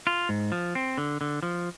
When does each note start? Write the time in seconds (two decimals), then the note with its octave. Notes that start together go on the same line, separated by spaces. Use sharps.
0.07 F4
0.29 G#2
0.52 F3
0.75 C4
0.98 D3
1.21 D3
1.43 F3